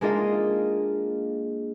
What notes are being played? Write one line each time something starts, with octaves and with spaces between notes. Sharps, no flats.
G#3 A#3 D4 F4 D#5 F5